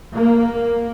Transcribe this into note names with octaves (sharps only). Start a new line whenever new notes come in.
A#3